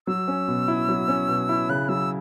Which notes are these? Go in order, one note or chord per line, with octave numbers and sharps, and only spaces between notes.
F#3 E6
C#4
B2
E4
F#3
C#4
B2
E4
C#3 F#6
F#3 E6